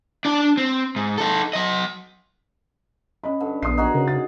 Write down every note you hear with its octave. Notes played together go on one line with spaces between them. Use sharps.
D4 D5
C4
G#2
D#4 A4
F#3 D#5
C#4 D#5 B5
G2 D3
A#1 B3 D#6 C7
D#4 F#4 G#4
C#3 A#4 B4 C#5
A6